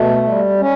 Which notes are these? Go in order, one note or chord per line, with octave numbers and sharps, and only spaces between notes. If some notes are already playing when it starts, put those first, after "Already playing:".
Already playing: B2 A3
G3
C#4